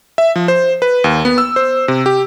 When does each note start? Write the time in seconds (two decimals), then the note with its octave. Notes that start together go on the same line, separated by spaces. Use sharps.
0.18 E5
0.36 F3
0.48 C5
0.82 B4
1.04 D#2
1.25 B3
1.38 E6
1.56 C5
1.88 C3
2.06 G4